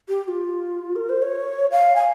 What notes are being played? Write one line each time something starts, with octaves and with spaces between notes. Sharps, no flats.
G4
G4
F4
A#4
C5
C#5
F5
G#5